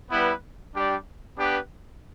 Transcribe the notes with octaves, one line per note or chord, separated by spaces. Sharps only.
G3 B3 E4 B4
G3 D4 G4 D5
B3 D4 G4 B4